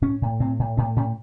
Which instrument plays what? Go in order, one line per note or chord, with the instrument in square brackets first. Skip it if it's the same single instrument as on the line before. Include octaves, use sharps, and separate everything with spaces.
[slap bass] A2 C#4
A2
A2 C4
A2
A2 B3
A2 C#4